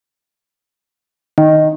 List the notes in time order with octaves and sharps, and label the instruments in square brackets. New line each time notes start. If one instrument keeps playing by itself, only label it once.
[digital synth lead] D#3